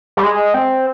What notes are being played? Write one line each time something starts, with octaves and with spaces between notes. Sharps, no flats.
G3
G#3
C4